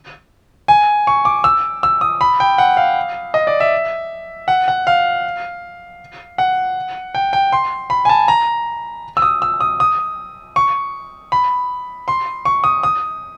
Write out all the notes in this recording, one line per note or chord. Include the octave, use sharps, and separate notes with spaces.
G#5
C#6
D6
E6
E6
D#6
B5
G5
F#5
F5
D#5
D5
E5
F#5
F#5
F5
F#5
G5
G5
C6
B5
G#5
A5
A#5
E6
D#6
E6
D#6
D#6
C#6
B5
C6
C#6
D#6
D#6